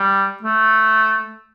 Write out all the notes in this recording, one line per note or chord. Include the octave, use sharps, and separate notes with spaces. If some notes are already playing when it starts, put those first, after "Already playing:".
Already playing: G3
A3